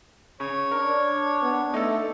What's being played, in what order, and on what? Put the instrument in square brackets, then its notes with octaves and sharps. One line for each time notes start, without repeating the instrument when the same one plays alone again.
[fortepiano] C#3 [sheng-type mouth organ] C#5
[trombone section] D4 [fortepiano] A#4
[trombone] B3
[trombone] A3 [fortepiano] D#4 A4